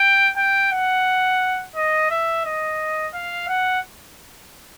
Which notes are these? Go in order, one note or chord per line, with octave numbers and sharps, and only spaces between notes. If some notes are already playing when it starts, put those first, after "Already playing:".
Already playing: G5
G5
F#5
D#5
E5
D#5
F5
F#5